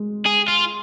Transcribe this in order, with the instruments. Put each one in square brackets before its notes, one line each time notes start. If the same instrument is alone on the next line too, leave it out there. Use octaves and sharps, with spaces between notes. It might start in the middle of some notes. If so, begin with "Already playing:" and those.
Already playing: [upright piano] G#3
[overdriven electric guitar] G#4
F4